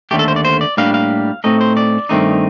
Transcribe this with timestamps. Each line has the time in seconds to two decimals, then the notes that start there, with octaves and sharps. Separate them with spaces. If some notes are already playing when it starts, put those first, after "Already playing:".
0.11 D#2 D3 A3 G4
0.19 A4
0.28 C5
0.36 D5
0.45 C5
0.61 D5
0.77 A2 G3 A#3 D4 F5
0.94 F5
1.44 A2 A3 C4 D#4 D#5
1.61 C5
1.77 D5
2.09 G2 D#3 A3 C4 D#4